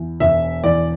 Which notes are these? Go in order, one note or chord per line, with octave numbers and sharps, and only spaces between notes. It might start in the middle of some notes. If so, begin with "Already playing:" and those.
Already playing: E2
E1 E5
E2 D5